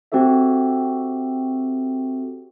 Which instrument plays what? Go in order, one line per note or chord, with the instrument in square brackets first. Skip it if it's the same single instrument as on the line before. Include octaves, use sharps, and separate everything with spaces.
[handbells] C4 F#4 G4 A4 E5